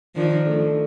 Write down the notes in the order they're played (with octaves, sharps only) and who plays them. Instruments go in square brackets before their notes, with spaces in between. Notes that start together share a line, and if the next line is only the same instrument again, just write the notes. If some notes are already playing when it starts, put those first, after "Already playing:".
[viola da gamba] D#3 F3 [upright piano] D4
[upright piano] A3